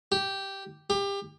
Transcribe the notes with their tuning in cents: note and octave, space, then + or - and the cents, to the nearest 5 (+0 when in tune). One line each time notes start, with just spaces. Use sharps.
G4 -5
G4 +25